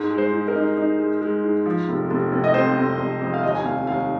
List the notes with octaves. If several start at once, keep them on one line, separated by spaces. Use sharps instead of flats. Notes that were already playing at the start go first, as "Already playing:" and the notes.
Already playing: G#2
G#3
C5
G#2
A#4
D#4
D#4
G#3
G#3
G#2
F3
F1
F1
F1
D#5
F2 C5
F1
F1
F2
F5
D#2 D#5
G#5
F1 F5
D#2 F5